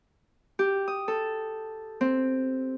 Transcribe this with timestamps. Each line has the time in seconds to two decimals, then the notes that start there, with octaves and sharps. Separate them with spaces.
0.59 G4
0.88 D#6
1.08 A4
2.01 C4